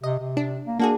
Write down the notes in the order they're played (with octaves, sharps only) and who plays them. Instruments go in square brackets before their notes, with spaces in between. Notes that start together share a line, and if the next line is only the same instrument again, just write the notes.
[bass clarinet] C3 [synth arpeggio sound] D#5
[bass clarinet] C3
[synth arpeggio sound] D4
[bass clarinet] A#3
[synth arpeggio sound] A#3 F#4 G#4 [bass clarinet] D4